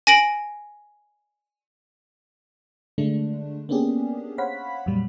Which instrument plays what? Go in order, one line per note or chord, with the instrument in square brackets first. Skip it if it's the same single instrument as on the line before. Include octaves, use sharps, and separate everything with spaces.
[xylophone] G#5 A#6 D7 F#7
[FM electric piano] D3 G#3 A3 D4
A#3 B3 C#4 D4 G4 G#4
C5 C#5 F5 F#5 B5 B6
F2 A#2 F#3 G3